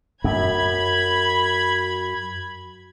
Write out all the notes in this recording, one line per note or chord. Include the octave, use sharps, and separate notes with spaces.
F#2 B5 G#6